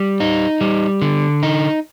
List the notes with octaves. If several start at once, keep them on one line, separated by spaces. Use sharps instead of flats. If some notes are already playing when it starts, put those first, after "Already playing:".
Already playing: G3
D#4
G3
D3
D#4